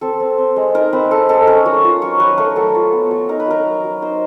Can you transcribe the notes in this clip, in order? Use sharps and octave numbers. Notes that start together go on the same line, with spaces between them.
C4 A4
C4
C4
G#3
D#4 A#4
C4 B4
G#3 A4
G#3 A4
C#4 A#4
F#3 F#4
F4
F#3 C#5
F#3 B4
A3 A#4
F#3 A4
F4
B3
F#3
D#4 A#4
B4
F#3 A#4
F#3
F#3
D#4 C5